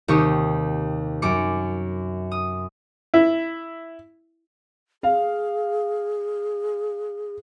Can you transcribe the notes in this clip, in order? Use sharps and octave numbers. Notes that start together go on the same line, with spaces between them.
D#2 C3 G4 C#6 D#6
F#2 D6 C#7
D#6
E4
G#4 F5